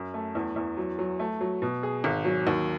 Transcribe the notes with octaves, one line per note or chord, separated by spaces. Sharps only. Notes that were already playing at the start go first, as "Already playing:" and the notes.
Already playing: F#2
A3
E2
E2
F#3
F#3
A3
F#3
B2
G#4
G#1
F#3
D#2